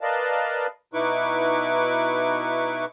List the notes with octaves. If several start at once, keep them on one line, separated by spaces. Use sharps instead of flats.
A#4 B4 D5 D#5 F5 A5
B2 D#4 E4 B4 C#6 D6